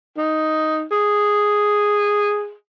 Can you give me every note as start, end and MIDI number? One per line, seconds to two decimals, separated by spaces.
0.17 0.84 63
0.91 2.54 68